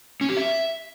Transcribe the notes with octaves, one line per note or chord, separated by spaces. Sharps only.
C#4
G4
E5